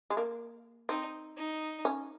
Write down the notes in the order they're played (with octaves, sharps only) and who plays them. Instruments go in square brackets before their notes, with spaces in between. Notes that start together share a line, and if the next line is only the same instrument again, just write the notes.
[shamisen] G#3
A#3
[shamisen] C4 [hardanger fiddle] D#4
[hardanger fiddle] D#4
[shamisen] C#4